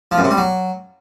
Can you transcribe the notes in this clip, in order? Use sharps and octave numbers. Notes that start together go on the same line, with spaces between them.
F3
F#2
C3
G3
F#3